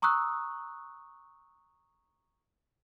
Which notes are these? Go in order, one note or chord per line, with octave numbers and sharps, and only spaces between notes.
A#5 C#6 D#6 E6 F#6